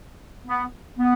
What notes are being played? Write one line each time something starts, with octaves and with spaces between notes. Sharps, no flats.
B3
B3